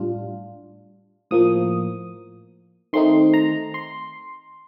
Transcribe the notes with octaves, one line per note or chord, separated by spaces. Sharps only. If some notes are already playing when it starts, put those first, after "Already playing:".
Already playing: A2 G3 D4 F4
A2 F3 A#3 D#6
D#3 A3 C4 D#4 C6
A#5
C6